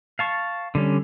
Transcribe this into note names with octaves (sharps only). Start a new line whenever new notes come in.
F5 A5 C#6
D3 G3 C#4